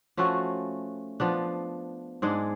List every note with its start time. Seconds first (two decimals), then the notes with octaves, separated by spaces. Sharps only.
0.17 F3 A3 C#4 F#4
1.20 F3 B3 D4
2.22 G#2 G#3 D4 G#4